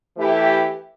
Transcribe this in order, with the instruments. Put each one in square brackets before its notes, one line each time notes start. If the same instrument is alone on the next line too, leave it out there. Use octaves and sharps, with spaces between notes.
[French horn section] E3 A3 E4 G4